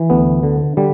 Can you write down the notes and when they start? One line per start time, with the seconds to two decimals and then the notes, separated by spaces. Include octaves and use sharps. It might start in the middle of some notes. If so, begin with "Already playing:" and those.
Already playing: E3
0.10 D2 B3
0.43 D3
0.77 D3 G3